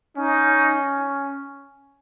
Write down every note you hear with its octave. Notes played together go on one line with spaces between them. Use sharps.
C#4 D#4